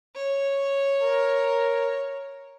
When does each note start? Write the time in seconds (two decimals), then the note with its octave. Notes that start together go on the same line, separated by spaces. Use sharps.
0.15 C#5
1.02 A#4